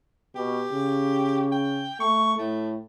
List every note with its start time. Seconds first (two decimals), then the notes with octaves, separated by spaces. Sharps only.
0.36 B2 G4
0.72 C#3
1.52 G5
2.00 A3 C#6
2.38 A2 A3